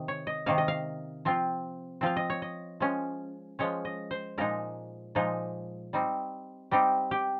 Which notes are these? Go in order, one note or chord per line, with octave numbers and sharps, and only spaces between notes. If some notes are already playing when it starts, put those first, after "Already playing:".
Already playing: C3 D#3
C#5
D#5
C3 D#3 A#3 D#4 F5
D#5
F5
F3 C4 F4
F3 C4 F4 F5
D#5
C#5
D#5
F3 G#3 C#4
F3 G#3 C#4 C#5
D#5
C5
A#2 F3 G#3 D#4 A#4
A#2 F3 G#3 D#4
G3 C4 D#4
G3 C4 D#4 G4
G4